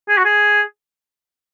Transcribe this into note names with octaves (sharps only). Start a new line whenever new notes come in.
G#4
F#4
G#4